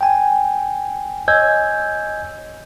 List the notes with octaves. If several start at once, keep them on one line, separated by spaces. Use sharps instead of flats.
G5 G#5
C#5 D#5 G#5 E6 G6 G#6